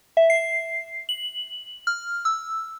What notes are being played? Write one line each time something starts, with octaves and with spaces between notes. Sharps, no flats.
E5
C7
F#7
F6
E6